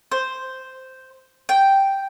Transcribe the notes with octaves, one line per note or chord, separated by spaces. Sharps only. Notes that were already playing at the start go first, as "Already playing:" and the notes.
C5
G5